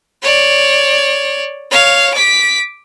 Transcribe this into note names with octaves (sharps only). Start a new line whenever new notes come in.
C#5 D5
C#5 F5
D6 B6